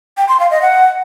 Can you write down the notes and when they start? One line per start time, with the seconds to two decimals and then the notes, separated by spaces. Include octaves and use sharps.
0.17 G5
0.28 C6
0.40 F5
0.51 D#5
0.62 F#5